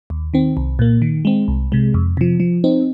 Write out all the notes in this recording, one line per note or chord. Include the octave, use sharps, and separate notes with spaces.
D#2
D#3 C4
C2
A#2 A#3
D#3
G#3 C4
C2
C3 G#3
F2
C3 F3
F3
C4 D#4